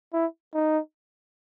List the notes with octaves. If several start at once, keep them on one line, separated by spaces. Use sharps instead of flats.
E4
D#4